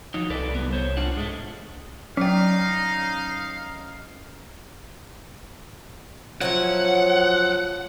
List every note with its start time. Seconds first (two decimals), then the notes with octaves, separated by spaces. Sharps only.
0.14 F3 F#3 D#4
0.30 C2 A4 B4 D5
0.55 G3 B3
0.73 C5 C#5
0.97 D4 F4 F#5
1.15 G#2 G#3 A3
2.17 F#3 C#4 D#4 D5 F5 G5
6.41 F3 F#3 C#4 E4 F#5